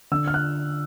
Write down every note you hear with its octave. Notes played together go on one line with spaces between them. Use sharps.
D3 E6
F6
F#6